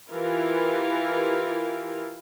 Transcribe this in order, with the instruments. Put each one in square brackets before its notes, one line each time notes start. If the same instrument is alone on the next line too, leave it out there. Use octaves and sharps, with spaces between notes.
[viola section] E3 E4 F4 G4 A#4